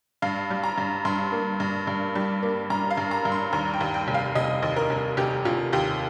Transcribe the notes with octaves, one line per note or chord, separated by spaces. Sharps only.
G2 F5
G3
A#5
G2
G2 C6
A#3
G2
G2
G3
A#3
G2 A#5
F5
G2
A#5
G2
C6
D#2 A#5
G5
D#2
G5
F1
F5
F1 D#5
D#2
A#4
F1
F1 G4
F1 F4
D#2 G4